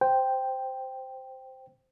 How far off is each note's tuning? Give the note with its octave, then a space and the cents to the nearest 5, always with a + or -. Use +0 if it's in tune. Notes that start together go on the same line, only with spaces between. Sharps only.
C5 -5 G5 +0